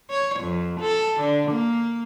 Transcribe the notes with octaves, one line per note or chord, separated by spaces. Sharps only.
C#5
F2
A4
D3
A#3